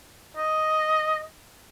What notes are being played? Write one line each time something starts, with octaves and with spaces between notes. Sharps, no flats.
D#5